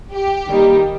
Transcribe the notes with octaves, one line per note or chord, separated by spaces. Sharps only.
G4
D#3 G3 A#3 D#4